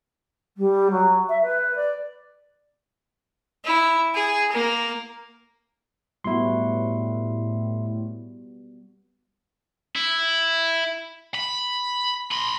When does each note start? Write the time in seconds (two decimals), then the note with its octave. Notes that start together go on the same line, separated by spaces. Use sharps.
0.57 G3
0.90 F#3
1.29 E5
1.42 B4
1.75 D5
3.65 E4
4.15 G#4
4.52 A#3 A#4
6.24 A2 G3 B3 E4 F#4 C6
9.96 E4
11.35 B5
12.32 B5 C6